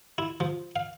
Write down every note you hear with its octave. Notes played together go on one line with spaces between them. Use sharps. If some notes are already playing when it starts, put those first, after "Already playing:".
E4
F3
F5